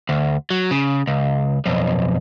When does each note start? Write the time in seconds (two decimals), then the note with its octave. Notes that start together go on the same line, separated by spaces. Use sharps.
0.09 D2
0.50 F#3
0.71 C#3
1.07 C#2
1.66 B1 F2